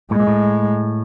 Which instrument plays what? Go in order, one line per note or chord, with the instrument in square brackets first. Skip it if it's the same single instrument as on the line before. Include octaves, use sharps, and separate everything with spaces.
[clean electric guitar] A2 [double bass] G#3
[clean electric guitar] A#2
A2